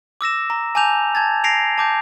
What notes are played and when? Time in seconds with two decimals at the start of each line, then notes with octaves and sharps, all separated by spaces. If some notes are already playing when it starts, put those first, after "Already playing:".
0.21 D6 E6 A#6 E7
0.50 A#5
0.75 G#5 A5 D6 G6 F7
1.15 A5 G#6 A6
1.44 A#6 C7 D7 F7
1.78 A5 D6 G6